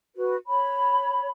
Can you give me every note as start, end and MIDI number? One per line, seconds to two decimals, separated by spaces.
0.15 0.34 66
0.15 0.34 71
0.46 1.27 73
0.46 1.27 83